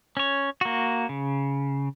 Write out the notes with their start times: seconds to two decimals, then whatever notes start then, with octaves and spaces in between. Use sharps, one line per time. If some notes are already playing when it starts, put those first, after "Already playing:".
0.17 C#4 C#5
0.61 A#3 F#4
1.09 C#3